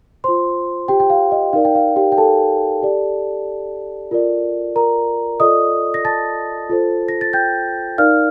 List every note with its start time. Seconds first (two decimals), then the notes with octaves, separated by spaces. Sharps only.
0.24 F4 C5 C6
0.88 G4 G5
1.00 G5
1.10 F5
1.32 D#5
1.53 D#4 A#4 D5 F5
1.65 G5
1.75 F5
1.96 G4 G5
2.12 G5
2.18 A4 A5
2.83 G4 D5
4.11 F4 A#4 D5
4.76 A#4 A#5
5.40 F4 A4 D5 D#5 D#6
5.94 A#6
6.05 A5 A6
6.69 F4 A4 C5
7.08 A#6
7.21 A6
7.33 G5 G6
7.98 D#4 A#4 D5 F5 F6